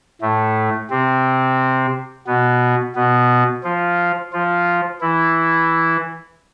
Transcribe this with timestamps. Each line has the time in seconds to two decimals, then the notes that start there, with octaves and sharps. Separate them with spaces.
0.21 A2 A3
0.90 C3 C4
2.27 B2 B3
2.96 B2 B3
3.64 F3 F4
4.33 F3 F4
5.01 E3 E4